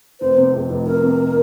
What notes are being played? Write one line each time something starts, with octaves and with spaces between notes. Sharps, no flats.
F1 C5
C3
F2
F1
F1 A#4
C3